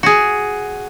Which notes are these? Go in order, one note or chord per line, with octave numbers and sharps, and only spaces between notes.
F#4 G#4